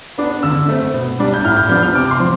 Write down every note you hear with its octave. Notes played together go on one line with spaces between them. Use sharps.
B3 D4
D3 E6
A3 C4
B2
G3 D4
G6
A2 F6
G6
F3 B3 D4 G6
F6
C3 D6
C6
F3 C4